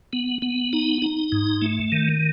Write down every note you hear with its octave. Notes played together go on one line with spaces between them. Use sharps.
B3
B3
D#4
D#4
G#2
A3
D#3